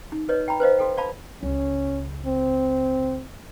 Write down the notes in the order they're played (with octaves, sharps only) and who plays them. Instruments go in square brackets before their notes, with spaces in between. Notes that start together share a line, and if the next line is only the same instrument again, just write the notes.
[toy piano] D#4
B4 C#5 D#5
G5 A#5 B5
B4 C5 D#5 F5
F#4 A4 G5
D5 F5 A5 B5
[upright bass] C#2 [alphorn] C#4
[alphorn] C4